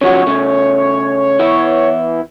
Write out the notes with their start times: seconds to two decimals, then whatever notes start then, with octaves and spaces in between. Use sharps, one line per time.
0.01 C#3 F3 F#4 C#5
0.27 C#3 A3
1.39 E3 B3 E4